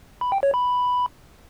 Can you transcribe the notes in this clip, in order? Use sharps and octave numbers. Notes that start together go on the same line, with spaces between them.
B5
G5
C#5
B5